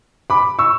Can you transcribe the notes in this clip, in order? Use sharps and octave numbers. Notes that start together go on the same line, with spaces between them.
B5 D6
C#6 E6